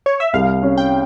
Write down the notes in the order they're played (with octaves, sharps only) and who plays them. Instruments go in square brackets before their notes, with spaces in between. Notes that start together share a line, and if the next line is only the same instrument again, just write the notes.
[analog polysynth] C#5
E5
[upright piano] C2 [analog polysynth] F5
[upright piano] C#4
[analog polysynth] G5